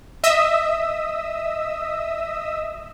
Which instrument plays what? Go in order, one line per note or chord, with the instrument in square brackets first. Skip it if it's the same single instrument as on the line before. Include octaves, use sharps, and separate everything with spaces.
[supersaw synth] D#5 E5 D#6 E6